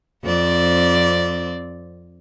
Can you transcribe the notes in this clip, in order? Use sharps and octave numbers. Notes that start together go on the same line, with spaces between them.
F2 C4 D5